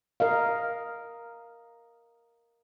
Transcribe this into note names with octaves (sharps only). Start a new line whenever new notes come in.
A#4 D#5 F5